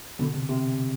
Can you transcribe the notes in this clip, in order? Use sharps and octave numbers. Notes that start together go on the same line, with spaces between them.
B2 D3
C3
C3